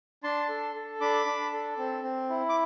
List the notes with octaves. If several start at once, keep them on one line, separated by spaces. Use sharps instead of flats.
D4 A5 C6
A4
A4
D4 B5 D6
D4
A4
C4
C4
E4
D6